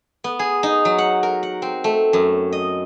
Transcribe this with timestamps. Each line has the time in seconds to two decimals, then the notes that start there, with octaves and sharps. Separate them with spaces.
0.24 B3
0.39 G#4
0.63 D#4
0.85 F#3
0.98 F#5
1.23 A#4
1.43 F#5
1.62 C4
1.84 A3
2.13 F#2
2.53 D#5